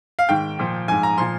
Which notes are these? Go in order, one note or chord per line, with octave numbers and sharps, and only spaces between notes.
F5
G#2 D#3 G5
A#2 F3
G#2 F3 G#5
A#5
A#2 F3 C6